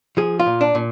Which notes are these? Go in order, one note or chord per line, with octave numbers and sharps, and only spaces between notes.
F3 G#4
F4
A#2
D4
A#2